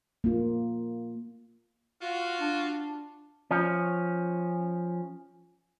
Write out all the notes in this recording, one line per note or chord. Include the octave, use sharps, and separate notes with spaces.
A#3 F4
F4 F#4
D4
F3 C#4